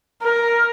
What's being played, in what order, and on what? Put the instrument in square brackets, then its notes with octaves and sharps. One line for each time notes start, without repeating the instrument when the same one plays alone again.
[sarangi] A#4